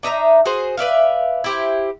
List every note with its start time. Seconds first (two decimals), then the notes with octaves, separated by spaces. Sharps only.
0.03 D4 D#4 E5 A#5
0.46 F#4 G#4 C5
0.77 B4 D5 E5 F5
1.44 E4 G4 C5